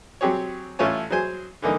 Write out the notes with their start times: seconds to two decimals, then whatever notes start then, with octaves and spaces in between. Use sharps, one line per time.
0.21 F#3 C4 G4 G#4 C#5
0.79 A1 A3 F4 A4 C#5 G#5
1.10 F#3 G#4 C5 G#5
1.62 D3 E3 A#3 D#4